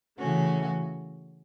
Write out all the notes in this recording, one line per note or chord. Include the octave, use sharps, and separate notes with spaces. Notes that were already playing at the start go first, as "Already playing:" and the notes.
C#3 E3 A3 C#4 F#4